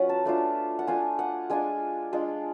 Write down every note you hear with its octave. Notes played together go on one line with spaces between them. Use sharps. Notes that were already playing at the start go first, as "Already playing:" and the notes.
Already playing: F#3 C#4 F4 B4 F#5
A5
A3 D4 F4
F#5
A3 D4 F4 G#5
F#5
G#3 D4 F4 G#5
G#3 D4 F4